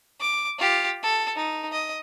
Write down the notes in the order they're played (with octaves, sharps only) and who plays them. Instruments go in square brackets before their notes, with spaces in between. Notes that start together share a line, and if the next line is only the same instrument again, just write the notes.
[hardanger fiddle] D6
F4 G4
A4
D#4
D#5